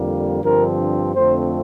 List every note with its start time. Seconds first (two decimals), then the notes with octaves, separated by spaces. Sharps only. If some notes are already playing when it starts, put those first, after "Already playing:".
Already playing: F2 D3 G3 A#3
0.43 G2 D3 F3 C4 A#4
1.14 F2 D3 A3 C4 C5